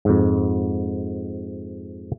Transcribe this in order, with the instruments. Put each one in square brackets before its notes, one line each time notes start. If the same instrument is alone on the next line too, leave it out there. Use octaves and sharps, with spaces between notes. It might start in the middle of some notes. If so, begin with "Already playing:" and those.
[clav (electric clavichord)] F2 G#2